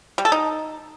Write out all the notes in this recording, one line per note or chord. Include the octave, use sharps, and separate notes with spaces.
G3
A4
D#4